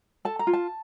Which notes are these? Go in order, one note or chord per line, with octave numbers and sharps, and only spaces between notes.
A4 A5
A#5
F4
A5